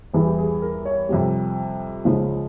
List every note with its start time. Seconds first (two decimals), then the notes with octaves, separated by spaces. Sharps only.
0.14 E2 E3 G3 G#4
0.26 G4
0.38 G#4
0.62 A#4
0.85 C#5
1.09 F2 C3 G3
2.05 C#2 C#3 F3 G#3